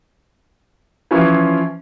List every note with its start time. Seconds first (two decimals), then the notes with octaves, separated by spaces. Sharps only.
1.11 E3 F3 C#4 E4 F4